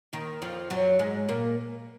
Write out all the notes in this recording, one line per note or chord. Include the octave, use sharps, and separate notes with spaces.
D#2 D#3
F2 F3
F#2 F#3
G#2 G#3
A#2 A#3